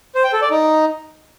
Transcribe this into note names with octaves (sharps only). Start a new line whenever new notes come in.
C5
G5
A4
D5
D#4